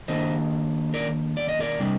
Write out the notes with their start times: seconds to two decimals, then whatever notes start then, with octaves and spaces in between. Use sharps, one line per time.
0.08 D#3 A#3 D4 C5 D#5
0.94 A#4 D5
1.37 D5
1.49 D#5
1.60 A#4 D5
1.80 C3 G3 D4